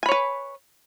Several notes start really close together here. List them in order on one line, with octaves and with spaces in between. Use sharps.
G#5 B5 C#5 B4